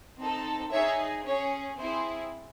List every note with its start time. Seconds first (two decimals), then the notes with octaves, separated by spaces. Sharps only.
0.17 C4 D#4 A4
0.71 D#4 G#4 C#5 E5
1.25 C#4 G#4 C#5
1.79 C4 E4 G#4 C5